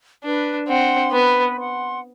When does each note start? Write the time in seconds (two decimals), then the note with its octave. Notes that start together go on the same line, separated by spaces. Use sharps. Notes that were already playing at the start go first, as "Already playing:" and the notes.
0.24 D4 B4
0.68 C4 F#5 C6
1.12 B3 B4
1.56 F#5 C6